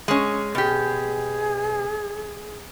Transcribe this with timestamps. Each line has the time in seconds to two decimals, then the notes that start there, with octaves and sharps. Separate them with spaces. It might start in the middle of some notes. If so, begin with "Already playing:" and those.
0.08 G#3 C#4
0.55 B2 G4 G#4